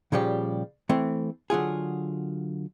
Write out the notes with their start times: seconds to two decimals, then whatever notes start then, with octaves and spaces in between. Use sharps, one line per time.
0.12 A#2 C#3 F3 G3 G4
0.89 E3 A3 C4
1.50 D3 F#3 F4 G#4